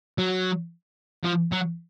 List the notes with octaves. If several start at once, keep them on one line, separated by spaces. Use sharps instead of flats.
F#3
F3
F#3